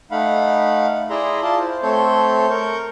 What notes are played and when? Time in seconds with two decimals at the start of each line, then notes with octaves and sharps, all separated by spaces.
0.11 A3 D#4 F5 F#5 B5
1.10 E4 G#4 D5 E5 A#5 C6
1.42 E4 F4 D5 A5 C6
1.59 C5
1.83 A3 C4 A4 C#5 C6 G6
2.50 A#4 C#6 G6